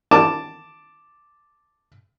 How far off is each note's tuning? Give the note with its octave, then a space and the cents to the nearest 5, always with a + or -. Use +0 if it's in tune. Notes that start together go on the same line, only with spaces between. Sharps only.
A5 +5 D6 +0